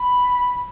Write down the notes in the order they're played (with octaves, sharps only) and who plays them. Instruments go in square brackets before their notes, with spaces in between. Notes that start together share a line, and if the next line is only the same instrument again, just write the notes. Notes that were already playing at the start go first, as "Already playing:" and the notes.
Already playing: [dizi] B5